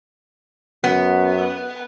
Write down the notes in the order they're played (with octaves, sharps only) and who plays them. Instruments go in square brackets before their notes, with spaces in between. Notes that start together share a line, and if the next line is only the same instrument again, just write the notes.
[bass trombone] F#2 [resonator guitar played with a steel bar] B3